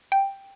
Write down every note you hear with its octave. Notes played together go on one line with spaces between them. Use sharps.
G5